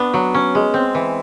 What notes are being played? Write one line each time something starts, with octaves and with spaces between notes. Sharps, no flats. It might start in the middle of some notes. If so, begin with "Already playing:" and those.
Already playing: B3 D4
F#3
C#4
G#3
C4
E3